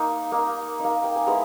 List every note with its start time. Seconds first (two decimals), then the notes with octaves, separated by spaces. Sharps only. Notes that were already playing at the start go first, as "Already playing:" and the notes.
Already playing: A#3 D#4
0.32 A#3 D#4
0.79 A#3 D#4
1.04 G5
1.16 G#5
1.27 G#3 B3 E4 A#5